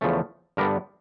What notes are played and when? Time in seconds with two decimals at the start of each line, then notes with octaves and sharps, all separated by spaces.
0.01 E2 C#3 F3 A3 C#4
0.57 G2 D3 G3 B3 D4 A#4